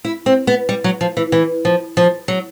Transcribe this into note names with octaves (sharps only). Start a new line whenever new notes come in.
E4
C4
B3
G3
F#3
F3
E3
E3
F3
F3
F#3